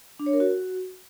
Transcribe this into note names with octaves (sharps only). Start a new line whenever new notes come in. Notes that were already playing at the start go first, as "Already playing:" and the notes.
D4
C#5
A#4
F#4